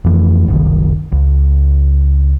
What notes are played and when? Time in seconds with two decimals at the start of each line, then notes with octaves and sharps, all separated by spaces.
0.04 F2 E3 A3
0.48 F#1 C2 C3 D#3
1.12 C#2